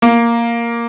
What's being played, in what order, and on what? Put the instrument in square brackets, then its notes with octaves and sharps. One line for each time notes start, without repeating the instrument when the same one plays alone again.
[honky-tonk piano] A#3